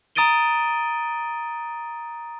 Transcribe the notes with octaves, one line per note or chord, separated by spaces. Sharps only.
A#5 D#6 A6 D7 D#7 G7